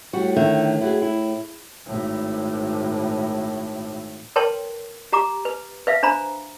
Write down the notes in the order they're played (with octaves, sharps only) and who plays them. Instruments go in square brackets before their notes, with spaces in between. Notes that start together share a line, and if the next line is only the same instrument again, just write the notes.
[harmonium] A2 [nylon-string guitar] G3 F#4
[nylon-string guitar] D3 D#3 E5
E4 F#4 G#4
E4
[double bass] G#1 A2
[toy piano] A#4 B4 C#5 G5 A5 C6
G4 A#5 D6
B4
B4 E5 F5
D4 C5 A#5 B5